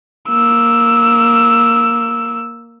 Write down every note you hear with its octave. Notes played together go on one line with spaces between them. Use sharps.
A#3 E6